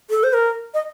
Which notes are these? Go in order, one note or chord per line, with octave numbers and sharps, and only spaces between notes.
A4
C5
A#4
D#5